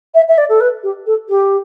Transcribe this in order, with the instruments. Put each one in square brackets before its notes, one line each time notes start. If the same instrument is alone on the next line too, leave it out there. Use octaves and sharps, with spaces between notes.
[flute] E5
E5
D5
A4
B4
G4
A4
G4